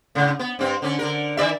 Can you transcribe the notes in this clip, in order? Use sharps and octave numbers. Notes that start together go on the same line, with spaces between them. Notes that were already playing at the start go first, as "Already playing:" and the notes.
A2 C#3
B3
G2 C4
D3 C#4
D3 A#4
D#3 D5 E5